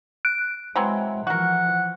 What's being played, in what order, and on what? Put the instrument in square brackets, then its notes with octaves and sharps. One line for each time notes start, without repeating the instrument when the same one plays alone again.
[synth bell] F#6 D7
[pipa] E3 F#3 C4 [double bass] G#3
[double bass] E3 F3 [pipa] F#4 A#4 [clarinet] F#5